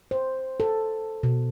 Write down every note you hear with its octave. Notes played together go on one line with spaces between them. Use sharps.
C5
A4
B2